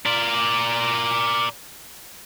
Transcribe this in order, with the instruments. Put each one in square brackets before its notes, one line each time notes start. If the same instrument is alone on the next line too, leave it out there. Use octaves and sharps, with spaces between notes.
[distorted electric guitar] A#4 D5